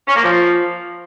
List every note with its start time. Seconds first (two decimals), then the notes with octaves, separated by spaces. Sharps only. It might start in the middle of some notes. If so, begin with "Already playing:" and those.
0.08 C#4
0.16 A#3
0.24 F3